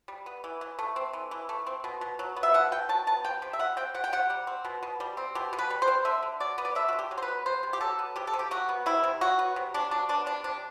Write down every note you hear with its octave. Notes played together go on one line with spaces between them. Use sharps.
G3
B3
E3
E3
A3
C4
E3
E3
A3
C4
B2
B2
F#3
B3
E5
B2 F#5
B2 G5
F#3 A5
B3 A5
C3 G5
C3
E5
G3 F#5
C4 G5
C3 F#5
G5
C3 F#5
G3
C4
B2
B2
G3
C4
B2 G4
B2
B4
G3
C5
C4
D3 E5
D3
F#3 D5
B3
D5
D3 E5
F#4
D3
G4
F#3
C5
B4
B3
C3 C5
C3
G4
F#3 A4
B3
C3 G4
A4
C3
G4
F#3 F#4
B3
C3 E4
C3
F#3 F#4
B3
C3
C3 D4
F#3 D4
B3 D4
C3 D4
C3 D4